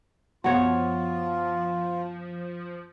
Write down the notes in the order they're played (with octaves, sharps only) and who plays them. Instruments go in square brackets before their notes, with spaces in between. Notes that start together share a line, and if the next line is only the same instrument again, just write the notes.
[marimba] F#2 B3 [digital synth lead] F3 [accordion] F4 [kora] F#4 C#5